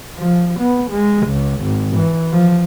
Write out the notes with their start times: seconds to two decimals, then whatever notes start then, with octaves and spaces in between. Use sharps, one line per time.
0.18 F3
0.59 B3
0.91 G#3
1.27 C#2
1.62 G#1
1.97 E3
2.32 F3